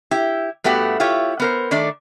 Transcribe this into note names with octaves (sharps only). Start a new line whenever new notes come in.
E4 G4
G2 A3 B3 F#4 G4
E4 F4 G4 C#5
B3 A#4 C5
D#3 A3 D4 D5